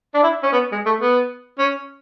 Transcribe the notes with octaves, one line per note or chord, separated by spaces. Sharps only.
D4
E4
C#4
B3
G#3
A3
B3
C#4